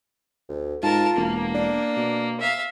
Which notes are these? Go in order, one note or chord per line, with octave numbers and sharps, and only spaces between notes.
D2
G#2 F4 A#4 A5
E1 A#3
D4
B2
E5 F5